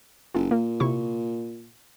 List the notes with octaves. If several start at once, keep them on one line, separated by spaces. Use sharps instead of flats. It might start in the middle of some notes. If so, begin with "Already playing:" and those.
F#1 F4
A#2 A#3
C3 E4 C#6